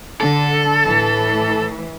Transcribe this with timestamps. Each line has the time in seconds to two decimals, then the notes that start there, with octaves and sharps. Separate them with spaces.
0.21 D3 A4
0.84 A2 E3